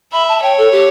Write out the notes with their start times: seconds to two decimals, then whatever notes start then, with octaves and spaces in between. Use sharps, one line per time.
0.12 E5 B5
0.28 A5
0.42 C#5 G5
0.57 A4
0.72 G4